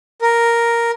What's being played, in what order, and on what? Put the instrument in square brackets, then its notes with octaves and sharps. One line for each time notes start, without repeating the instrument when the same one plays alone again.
[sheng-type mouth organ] A#4